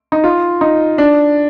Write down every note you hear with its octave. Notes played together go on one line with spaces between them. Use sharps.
D#4
F4
D#4
D4